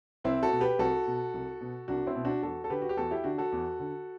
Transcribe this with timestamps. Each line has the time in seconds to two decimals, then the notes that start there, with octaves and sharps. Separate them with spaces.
0.24 C2 C4 E4
0.43 F#4 A4
0.52 B2
0.61 G4 B4
0.79 C2 F#4 A4
1.07 B2
1.34 C2
1.61 B2
1.88 C2 D4 F#4
2.06 C4 E4
2.16 B2
2.25 D4 F#4
2.43 E2 F#4 A4
2.64 A4
2.70 D3 G4 B4
2.82 F#4
2.89 G4
2.97 E2 F#4 A4
3.11 E4 G4
3.24 D3 D4 F#4
3.38 F#4 A4
3.52 E2
3.79 D3